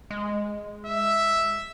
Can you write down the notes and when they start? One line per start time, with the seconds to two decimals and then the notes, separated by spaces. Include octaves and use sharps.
0.11 G#3
0.86 E5